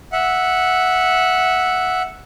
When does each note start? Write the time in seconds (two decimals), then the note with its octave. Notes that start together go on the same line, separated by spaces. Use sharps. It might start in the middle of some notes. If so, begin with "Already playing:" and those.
0.12 E5 F#5